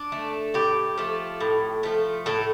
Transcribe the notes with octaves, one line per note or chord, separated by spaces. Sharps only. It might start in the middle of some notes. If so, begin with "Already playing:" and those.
Already playing: D4
A3
A2 G4
F3 A3
A2
F3 A3
A2 A4